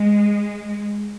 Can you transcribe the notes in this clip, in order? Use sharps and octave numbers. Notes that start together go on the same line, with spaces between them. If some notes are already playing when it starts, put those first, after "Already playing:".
Already playing: G#3